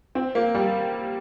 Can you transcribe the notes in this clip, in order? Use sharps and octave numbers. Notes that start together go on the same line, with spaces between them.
C4
A#3
G3